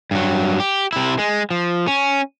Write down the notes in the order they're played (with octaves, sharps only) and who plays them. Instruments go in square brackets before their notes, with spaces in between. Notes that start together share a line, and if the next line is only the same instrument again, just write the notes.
[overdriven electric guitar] G2 F#3
G4
C3 E4
G#3
F3
C#4